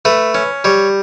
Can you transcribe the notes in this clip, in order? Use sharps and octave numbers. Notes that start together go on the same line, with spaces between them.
A3 B4
C#4
G3 C#5